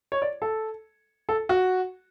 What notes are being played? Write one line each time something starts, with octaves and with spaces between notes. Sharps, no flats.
C#5
D5
A4
A4
F#4